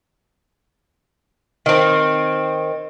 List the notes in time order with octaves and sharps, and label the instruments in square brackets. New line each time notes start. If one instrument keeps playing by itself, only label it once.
[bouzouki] D#3 C4